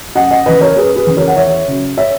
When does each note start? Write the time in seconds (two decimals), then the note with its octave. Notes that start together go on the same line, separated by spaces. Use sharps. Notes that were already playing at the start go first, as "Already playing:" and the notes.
0.15 F#2 D#5 F#5
0.31 D#5 F#5
0.46 C#3 E3 B4 D#5
0.61 A#4 C#5
0.76 F#2 G#4 B4
0.96 G#4 B4
1.07 C#3 E3
1.17 A#4 C#5
1.28 F#5
1.37 E2 C#5 E5
1.68 C#3 F#3
1.97 C#5 E5